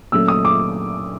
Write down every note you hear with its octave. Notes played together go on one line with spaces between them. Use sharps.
A#2 F#3 A3 C#4 E6
D#6
D6